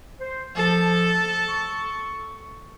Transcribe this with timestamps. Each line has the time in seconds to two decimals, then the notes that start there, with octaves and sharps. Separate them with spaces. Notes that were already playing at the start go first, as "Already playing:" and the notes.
0.20 C5
0.56 F3 A4
1.48 C#6